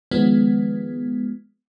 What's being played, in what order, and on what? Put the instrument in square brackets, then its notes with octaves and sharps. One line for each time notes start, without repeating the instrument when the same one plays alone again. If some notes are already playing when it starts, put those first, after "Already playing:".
[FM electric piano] D#3 F3 G#3 B3